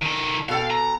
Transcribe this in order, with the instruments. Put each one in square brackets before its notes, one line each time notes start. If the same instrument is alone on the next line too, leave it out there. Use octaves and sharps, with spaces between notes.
[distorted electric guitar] D#3 A4
[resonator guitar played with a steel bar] B2 A4 G5 [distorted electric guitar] F5
[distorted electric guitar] A#5